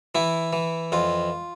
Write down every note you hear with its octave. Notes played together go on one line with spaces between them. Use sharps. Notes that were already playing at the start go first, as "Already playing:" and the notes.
E3 E4
E3
F2 F4